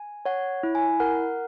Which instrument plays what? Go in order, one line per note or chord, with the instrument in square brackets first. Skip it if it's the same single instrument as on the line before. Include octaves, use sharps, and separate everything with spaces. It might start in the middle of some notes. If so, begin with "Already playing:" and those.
Already playing: [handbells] G#5
[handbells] C#5 [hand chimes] F#5
[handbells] E4
[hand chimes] G#5
[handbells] A#4 [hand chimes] F#5